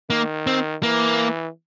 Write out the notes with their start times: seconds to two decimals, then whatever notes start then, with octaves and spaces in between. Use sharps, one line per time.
0.10 D#3 A#3
0.47 C4
0.83 E3 A#3